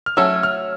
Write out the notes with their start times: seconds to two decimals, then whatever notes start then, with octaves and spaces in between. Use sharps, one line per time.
0.06 F6
0.17 F#3 A3 C#4 E6
0.43 F6